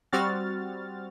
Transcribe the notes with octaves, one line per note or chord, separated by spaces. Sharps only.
G3 C4 F#4 F6 A6